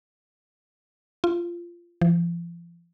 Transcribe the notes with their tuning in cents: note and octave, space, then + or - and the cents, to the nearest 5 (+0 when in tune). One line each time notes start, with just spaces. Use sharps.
F4 -15
F3 -40